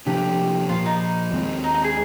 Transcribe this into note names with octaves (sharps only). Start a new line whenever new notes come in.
C3 F3 A#3 D4 G4
A#2 F3 A#3 F4
D#4
D#2 D#3 G#3 C4
D#4
D#4
G#4